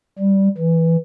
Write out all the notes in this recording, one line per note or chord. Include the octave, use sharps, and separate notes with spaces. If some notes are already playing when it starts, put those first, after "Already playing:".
G3
E3